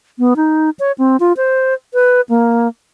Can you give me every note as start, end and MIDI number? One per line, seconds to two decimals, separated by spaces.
0.19 0.34 59
0.36 0.70 63
0.79 0.92 73
0.98 1.17 60
1.20 1.33 65
1.37 1.74 72
1.94 2.21 71
2.29 2.68 58